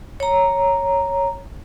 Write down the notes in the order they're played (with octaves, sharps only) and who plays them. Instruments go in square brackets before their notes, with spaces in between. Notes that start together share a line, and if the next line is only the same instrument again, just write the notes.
[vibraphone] C#5 A#5